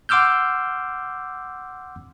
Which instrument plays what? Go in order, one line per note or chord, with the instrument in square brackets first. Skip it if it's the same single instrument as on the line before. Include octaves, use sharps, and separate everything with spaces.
[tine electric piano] F#5 C6 D6 E6 F6 G6